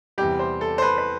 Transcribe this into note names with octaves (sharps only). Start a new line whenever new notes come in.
E2 C3 G3 G4
C5
A4
C5
B4
B4